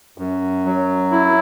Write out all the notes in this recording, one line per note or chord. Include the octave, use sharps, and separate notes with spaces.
F#2
F#3
E4